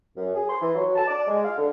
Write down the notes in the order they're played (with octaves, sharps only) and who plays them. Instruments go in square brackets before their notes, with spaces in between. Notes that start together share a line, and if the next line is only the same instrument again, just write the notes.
[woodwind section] F#2
G#4
C6
E3
F#3
A5
D5
G#3
F5
D3